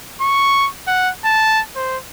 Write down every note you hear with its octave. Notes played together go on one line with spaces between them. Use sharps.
C#6
F#5
A5
C5